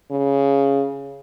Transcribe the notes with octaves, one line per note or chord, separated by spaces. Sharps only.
C#3